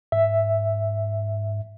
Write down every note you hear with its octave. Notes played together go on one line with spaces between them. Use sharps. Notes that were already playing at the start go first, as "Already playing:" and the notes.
G#2 E5